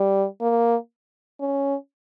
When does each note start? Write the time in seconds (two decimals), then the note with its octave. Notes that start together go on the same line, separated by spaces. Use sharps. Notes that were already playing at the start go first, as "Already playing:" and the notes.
Already playing: G3
0.41 A#3
1.40 C#4